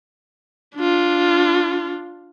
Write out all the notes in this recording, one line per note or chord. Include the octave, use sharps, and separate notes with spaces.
D4 F4